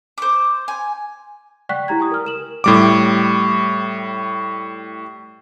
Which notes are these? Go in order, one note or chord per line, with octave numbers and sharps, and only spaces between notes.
C5 D6
G#5
D5 F#5 G5 C#6 F#6 B6
E4 G4 A#5 G#6
G#5 C#6 D#6
A#4 F6
A#4 E7 F#7
A2 G3 D6